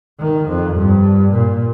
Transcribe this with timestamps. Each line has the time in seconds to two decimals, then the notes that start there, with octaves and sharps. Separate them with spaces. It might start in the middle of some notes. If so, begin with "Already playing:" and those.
0.20 D#3
0.48 F2
0.75 G2
1.32 A#2